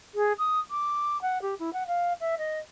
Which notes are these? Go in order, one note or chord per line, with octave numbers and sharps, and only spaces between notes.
G#4
D#6
D6
F#5
G4
E4
F#5
F5
E5
D#5